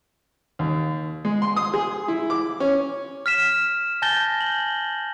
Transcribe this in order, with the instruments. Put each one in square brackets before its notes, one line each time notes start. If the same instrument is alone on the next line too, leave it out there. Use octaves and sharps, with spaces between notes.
[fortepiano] D#2
G#3
C6
D#6
G#4
E4
D6
C#4
[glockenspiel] F6 B6 E7
G#5 A5 G6 A6 A#6 G7
F#7